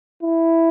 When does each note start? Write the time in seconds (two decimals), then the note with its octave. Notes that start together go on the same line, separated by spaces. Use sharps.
0.23 E4